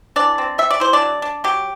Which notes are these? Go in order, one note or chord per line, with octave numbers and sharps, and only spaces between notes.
E3 D4 D5
C4
G3 E5
D5
E4 C5
D4 D5
F#3
D4
F#3 G4